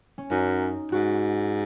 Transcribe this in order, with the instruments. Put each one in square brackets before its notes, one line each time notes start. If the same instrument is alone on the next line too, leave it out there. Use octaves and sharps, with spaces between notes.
[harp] C#4
[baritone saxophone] F#2 [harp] D#4
[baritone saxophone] G#2 [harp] F#4